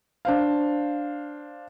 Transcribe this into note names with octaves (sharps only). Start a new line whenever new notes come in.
D4 C5 F5